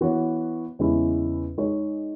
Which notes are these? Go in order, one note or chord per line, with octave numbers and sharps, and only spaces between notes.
E3 B3 F#4 C#5
E2 C#3 G#3 C#4 E4
G#3 D#4 G#4 C#5